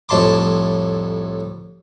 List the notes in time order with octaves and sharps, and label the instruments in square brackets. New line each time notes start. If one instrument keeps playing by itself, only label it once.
[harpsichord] C2 F2 A2 A5 C6 D6